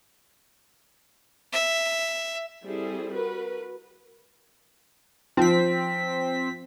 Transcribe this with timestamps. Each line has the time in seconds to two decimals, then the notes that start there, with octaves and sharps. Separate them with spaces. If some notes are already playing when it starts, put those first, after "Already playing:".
1.52 E5
2.65 G3 C4 E4 G#4 A4
3.14 F#4 A#4 B4
5.37 F3 C4 B6